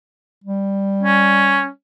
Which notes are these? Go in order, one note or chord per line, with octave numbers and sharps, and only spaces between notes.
G3
C#4